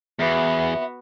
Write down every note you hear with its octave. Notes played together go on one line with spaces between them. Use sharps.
E2 B3 F#4 E5